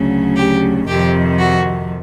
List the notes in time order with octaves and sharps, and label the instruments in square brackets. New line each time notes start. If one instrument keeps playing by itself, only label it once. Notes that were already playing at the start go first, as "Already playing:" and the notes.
Already playing: [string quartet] D2 C#3 F#3
G4
F2 C3 D#3 G4
F#4